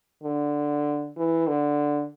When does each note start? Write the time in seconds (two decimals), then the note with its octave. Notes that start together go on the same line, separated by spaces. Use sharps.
0.24 D3
1.17 E3
1.48 D3